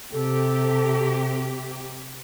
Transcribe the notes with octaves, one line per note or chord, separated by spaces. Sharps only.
C3 G4 A4